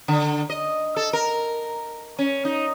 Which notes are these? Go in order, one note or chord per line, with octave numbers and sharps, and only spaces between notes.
D3
D#5
A4
A#4
C#4
D#4